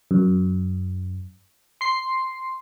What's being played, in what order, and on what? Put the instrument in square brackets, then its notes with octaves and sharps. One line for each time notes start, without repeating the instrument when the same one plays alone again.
[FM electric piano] F#2
C6 C7